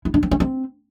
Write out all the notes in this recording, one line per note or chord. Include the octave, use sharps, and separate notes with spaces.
E4
D4
C4
C#4
C4